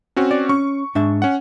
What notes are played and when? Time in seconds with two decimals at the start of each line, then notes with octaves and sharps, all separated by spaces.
0.16 C4 C#4 F#4
0.31 D5
0.49 C#4 C#6
0.95 G#2 D4 E5
1.22 C#4 F#5